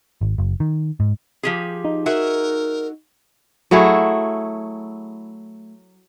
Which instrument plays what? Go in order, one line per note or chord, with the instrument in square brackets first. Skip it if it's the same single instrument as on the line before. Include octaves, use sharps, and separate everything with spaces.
[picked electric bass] G#1
F#1
D#3
G#2
[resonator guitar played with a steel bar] F3 G4 G#4
[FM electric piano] D#4
[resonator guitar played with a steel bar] F#4 G#4 E5 [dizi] A#4
[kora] F#3 A3 E4 G#4